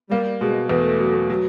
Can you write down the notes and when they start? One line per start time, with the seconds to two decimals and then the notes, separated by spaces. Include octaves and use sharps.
0.11 G3 A#3
0.41 B2 G#3
0.70 E2 A3
0.99 F#3
1.30 F#3